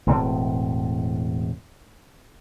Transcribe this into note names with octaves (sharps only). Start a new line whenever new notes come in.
E1 A2 C4